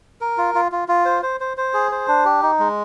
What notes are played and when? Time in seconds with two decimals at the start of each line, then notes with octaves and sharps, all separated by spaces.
0.21 A#4
0.38 F4
0.55 F4
0.72 F4
0.88 F4
1.05 C5
1.23 C5
1.40 C5
1.57 C5
1.74 G#4
1.92 C5
2.08 D4
2.25 G4
2.42 D#4
2.59 G#3